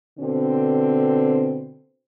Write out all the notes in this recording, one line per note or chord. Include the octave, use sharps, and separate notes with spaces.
B2 D3 C4